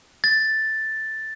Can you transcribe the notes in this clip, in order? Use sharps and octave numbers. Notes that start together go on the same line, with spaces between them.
A6